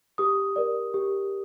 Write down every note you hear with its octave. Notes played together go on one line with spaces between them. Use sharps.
G4 D#6
A#4 D5
G4